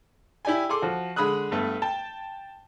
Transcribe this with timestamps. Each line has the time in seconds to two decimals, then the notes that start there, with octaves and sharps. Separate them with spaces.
0.45 E4 G4 D5 G5 G#5
0.69 G#4 A4 C6 D6
0.82 F3 F#4
1.16 D3 G#3 G#4 B5 D#6 F#6
1.52 G2 A3 B3
1.82 G5 A5